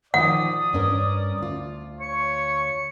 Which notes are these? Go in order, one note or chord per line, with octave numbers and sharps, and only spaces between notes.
D#3 F3 D5 F#5 D#6
G2 C#4 A#4
D2 F4
C#5 C#7